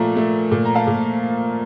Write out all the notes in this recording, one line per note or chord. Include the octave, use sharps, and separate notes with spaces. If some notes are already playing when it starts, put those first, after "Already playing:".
Already playing: A#2 F3 A3 A#5
A3
A#2
A#5
F5 A5
A#2